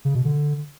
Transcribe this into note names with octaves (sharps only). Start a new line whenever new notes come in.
C#3
B2
D3